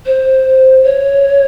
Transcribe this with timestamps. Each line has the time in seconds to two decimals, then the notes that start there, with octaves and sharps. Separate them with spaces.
0.06 C5
0.84 C#5